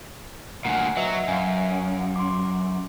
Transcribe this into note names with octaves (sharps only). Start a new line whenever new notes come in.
D2 A#2 F#5 G#5
F#3 B4 D#5 E5
F#2 F5 G#5
C6 D6